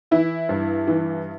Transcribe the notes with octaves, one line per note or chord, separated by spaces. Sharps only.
E3 E4
G2
E3